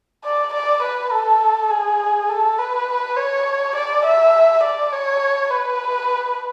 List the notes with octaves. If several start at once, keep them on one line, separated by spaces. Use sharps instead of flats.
D5
D5
B4
A4
G#4
A4
B4
C#5
D5
E5
D5
C#5
B4